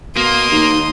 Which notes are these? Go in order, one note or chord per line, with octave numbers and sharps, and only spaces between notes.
B2 A#3 C6 D#6
D#2 D#4